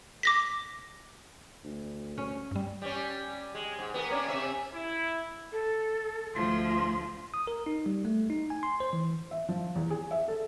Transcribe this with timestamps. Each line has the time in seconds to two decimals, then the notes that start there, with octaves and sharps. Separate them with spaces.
0.23 D6 A#6 B6
1.64 D2
2.18 C#4
2.51 G2 G3
2.82 G3 C#4
3.55 G#3
3.79 G#2
3.94 B3 G4 A#4
4.10 A#3 C#4 D4
4.28 C3 C#4 E5
4.74 E4
5.52 A4
6.34 D2 F3 C6
7.34 D#6
7.47 A#4
7.66 D#4
7.86 G3
8.05 A3
8.30 D#4
8.50 G#5
8.63 C6
8.80 C5
8.93 E3
9.31 E5
9.49 F3
9.76 E2
9.90 G#4
10.11 E5
10.28 A4